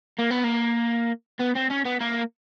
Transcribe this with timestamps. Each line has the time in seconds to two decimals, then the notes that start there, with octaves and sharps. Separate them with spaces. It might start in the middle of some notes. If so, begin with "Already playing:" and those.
0.18 A#3
0.30 B3
0.44 A#3
1.39 B3
1.55 C4
1.70 C#4
1.85 B3
2.01 A#3